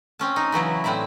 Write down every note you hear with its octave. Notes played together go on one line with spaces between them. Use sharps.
C4 C#4 A5
D#4
C#3 E3 F#3 E4
A2 C4 E4 D5 E5